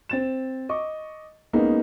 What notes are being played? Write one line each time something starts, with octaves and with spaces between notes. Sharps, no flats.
C4 A6 E7
D#5 C#6 D6
G#3 A#3 B3 C#4 D#4